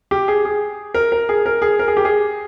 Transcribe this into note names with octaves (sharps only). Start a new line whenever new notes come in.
G4
G#4
G#4
A#4
A#4
G#4
A#4
G#4
A#4
G#4
G4
G#4